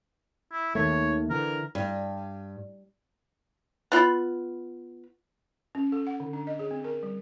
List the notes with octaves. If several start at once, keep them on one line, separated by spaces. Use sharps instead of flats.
E4
D#2 D#3 A3 C#5
D3 E3 A#4
G2
B3 F4 B5
C#4
A4
F#5
D3
D4
D#5
G#4
C4
A#4
G3